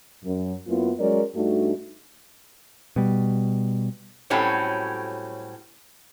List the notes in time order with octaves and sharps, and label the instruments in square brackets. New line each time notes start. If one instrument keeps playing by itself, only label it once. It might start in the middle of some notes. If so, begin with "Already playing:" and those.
[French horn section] F#2
F#2 A#3 B3 E4 F4
F#3 G#3 C#4 A#4 C#5 D5
G2 A3 D4 D#4 F#4
[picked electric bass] B2 G3
[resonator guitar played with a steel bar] A2 F#3 G3 C4 C#4 F#4